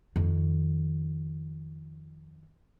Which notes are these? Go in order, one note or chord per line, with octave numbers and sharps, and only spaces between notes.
F2 D#3